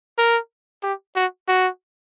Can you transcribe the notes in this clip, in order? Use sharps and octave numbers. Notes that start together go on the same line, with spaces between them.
A#4
G4
F#4
F#4